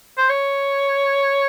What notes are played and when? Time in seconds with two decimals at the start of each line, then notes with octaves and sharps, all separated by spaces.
0.17 C5
0.29 C#5